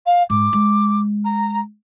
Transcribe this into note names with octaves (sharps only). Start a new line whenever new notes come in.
F5
G#2 D6
G#3
A#5